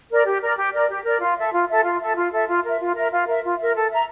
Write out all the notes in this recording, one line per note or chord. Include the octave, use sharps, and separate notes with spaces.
A#4 D5
G4
A#4 D5
G4
A#4 D5
G4
A#4 D5
F4
A4 E5
F4
A4 E5
F4
A4 E5
F4
A4 E5
F4
A#4 E5
F4
A#4 E5
F4
A#4 E5
F4
A#4 E5
A4
E5 A#5